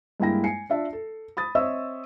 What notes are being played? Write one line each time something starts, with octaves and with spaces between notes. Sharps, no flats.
G2 G#3 A#3 E4 G5 A#6
G#5 C7 C#7
D4 F4 E5 A5
A4
B5 D#6 A6
C4 C#5 D#5 E5 E6